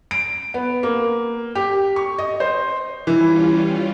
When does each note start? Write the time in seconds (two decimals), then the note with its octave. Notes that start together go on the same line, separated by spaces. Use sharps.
0.11 D7
0.54 B3
0.83 A#3
1.55 G4
1.96 C#6
2.18 D#5
2.40 C5
3.07 E3 G3 C#4 F4